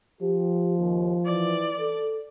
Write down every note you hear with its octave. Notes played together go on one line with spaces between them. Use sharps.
F3 G4
D#2
E3 D5
A4